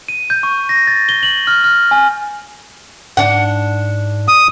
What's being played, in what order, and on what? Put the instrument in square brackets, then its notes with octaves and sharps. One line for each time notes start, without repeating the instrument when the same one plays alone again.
[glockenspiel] D#7
G6
C#6
A#6
A6
G7
F#7
F6
F6
G#5
[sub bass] G#2 [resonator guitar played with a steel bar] D4 F#5
[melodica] D#6